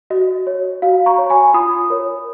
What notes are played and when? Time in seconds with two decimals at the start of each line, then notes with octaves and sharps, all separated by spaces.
0.10 F#4 D#5
0.47 C#5
0.82 F#4 F5
1.06 A#5 C#6
1.18 C#5
1.30 G#5 B5
1.54 F4 B5 D#6
1.90 A#4 C#5